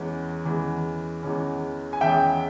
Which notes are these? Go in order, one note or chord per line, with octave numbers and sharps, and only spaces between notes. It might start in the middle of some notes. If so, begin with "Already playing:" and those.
Already playing: E2 E3 G#3 C#4
E2 E3 G#3 C#4
E2 E3 G#3 C#4
G#5
E2 E3 G#3 C#4 E5 G5